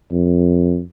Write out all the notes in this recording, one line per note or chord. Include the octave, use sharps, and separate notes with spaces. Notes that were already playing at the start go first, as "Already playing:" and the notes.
F2